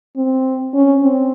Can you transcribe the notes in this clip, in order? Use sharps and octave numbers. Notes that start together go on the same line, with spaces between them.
C4
C#4
C4